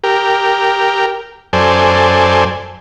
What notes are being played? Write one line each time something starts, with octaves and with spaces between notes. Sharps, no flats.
G4 A#4
F#2 A4 C5 D5 G#5